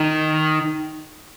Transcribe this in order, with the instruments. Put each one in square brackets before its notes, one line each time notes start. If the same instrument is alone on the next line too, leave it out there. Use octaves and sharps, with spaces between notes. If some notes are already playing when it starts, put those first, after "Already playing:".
Already playing: [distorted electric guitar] D#3